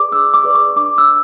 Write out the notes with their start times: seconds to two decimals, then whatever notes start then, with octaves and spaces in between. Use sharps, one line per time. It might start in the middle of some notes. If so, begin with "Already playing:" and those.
Already playing: G#4 B4 D5 D6
0.11 D4 E6
0.34 D6
0.44 G#4 B4 D5
0.55 C#6
0.76 D4 D6
0.98 E6